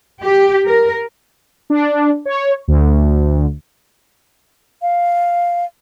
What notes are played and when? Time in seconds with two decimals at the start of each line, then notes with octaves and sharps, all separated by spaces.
0.23 G4
0.66 A#4
1.70 D4
2.25 C#5
2.68 D2
4.82 F5